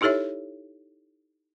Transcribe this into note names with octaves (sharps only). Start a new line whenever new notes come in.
D#4 E4 G4 A4 C#5 E5